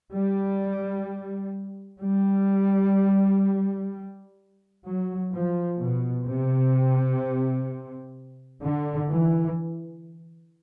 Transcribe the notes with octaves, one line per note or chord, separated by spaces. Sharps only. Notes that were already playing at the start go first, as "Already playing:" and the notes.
G3
G3
F#3
F3
B2
C3
D3
E3